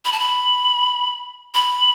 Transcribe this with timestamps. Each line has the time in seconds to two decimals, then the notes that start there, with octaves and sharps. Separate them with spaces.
0.05 B5
0.12 A5
0.19 B5
1.54 B5